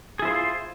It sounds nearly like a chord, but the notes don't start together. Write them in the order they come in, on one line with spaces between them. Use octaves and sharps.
G#4 E4 C5 F4